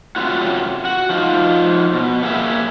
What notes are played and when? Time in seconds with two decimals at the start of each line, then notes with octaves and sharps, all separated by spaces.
0.16 F#2 C3 A3 C4 F4 F#4
0.85 F#4
1.09 F3 D#4 F4
1.93 B2
2.22 A#3 G4 G#4 D#5 E5